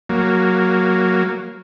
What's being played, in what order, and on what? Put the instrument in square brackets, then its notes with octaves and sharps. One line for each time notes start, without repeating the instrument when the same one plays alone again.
[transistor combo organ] F#3 A#3